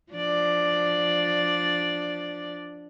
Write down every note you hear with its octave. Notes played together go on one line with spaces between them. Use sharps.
F3 D4 D5